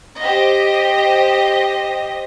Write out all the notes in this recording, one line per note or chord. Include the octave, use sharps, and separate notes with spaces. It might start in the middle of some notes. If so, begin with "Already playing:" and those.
G4 C5 D#5